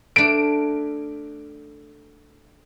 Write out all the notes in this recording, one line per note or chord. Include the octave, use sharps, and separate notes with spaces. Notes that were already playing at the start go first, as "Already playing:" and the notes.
A3 D4 D7